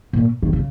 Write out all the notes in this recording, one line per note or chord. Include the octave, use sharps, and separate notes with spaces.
A#2
D#3
C#3